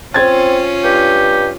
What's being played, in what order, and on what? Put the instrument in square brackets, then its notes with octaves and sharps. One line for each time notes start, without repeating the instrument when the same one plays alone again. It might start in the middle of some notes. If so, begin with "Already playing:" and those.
[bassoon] C4 [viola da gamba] C#4 F4 [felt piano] C5 G#6 A6
[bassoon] G2 [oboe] G4